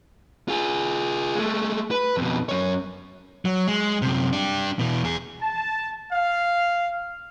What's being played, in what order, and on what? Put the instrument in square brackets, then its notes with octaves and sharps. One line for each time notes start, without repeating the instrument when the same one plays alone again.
[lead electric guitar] F4 G#4
G#3 A3
B4
F2 B2
F#2 C#5
[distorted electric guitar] F#3
G#3
F#2 C3
D4 G4
B2 E3
E2 G#4
[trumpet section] A5
F5